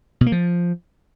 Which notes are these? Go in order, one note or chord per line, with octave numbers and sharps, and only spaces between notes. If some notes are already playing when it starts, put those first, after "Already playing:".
B2
A#3
F3